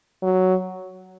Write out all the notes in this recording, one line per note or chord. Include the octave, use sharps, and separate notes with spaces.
F#3